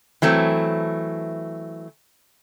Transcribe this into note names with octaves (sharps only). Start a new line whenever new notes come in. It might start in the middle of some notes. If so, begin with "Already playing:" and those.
E3 F#3 A3 C4